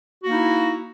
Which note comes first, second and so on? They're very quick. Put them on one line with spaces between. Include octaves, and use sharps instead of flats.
F#4 A#3 D#4 E4